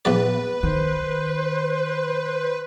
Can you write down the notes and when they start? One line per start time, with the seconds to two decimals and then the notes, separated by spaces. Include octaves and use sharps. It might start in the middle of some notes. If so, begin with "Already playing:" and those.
0.05 A#1 E2 B4 D5
0.63 D#3 C5